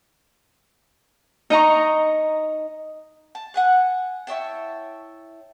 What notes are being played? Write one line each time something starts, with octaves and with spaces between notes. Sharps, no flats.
D#4 D#5 A#5 C#6
A5
F#5 G#5 F#6
E4 C#5 G5 A5